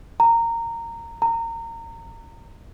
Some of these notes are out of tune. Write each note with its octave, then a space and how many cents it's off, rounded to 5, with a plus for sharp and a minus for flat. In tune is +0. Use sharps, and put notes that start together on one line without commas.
A#5 -15
A#5 -25